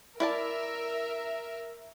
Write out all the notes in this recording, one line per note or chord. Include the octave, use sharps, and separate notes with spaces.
E4 A#4 D5 E5 A5